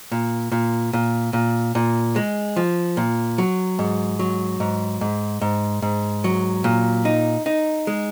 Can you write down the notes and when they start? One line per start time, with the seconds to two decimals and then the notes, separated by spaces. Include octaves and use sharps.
0.12 A#2
0.52 A#2
0.93 A#2
1.33 A#2
1.75 A#2
2.16 G#3
2.56 F3
2.97 A#2
3.38 F#3
3.79 G#2
4.19 F#3
4.60 G#2
5.01 G#2
5.41 G#2
5.82 G#2
6.24 F#3
6.64 A#2
7.05 D#4
7.46 D#4
7.87 G#3